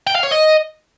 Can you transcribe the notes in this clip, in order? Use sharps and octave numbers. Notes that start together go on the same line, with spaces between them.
G5
F5
C#5
D#5